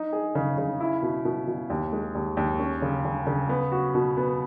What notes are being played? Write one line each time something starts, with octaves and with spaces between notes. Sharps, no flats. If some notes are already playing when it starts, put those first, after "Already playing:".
Already playing: D#4
G#4
C#3
C#3
E4
B2
B2
B2
D#2
G#3
D#2
D#2
C#4
C#3
C#3
C#3
B3
F#4
B2
B3